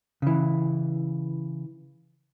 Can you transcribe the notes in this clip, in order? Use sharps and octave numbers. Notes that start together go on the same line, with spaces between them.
C#3 E3